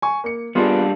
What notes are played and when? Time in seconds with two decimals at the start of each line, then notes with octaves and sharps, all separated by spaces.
0.02 G#5 C#6
0.24 A#3 C#7
0.55 G3 A#3 B3 D4 F4 G#4